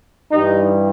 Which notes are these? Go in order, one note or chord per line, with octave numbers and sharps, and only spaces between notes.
G2 E3 G3 D#4